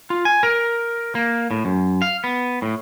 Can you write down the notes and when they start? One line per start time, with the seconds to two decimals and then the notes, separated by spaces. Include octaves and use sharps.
0.10 F4
0.25 G#5
0.43 A#4
1.15 A#3
1.51 A2
1.65 F#2
2.02 F5
2.24 B3
2.62 A2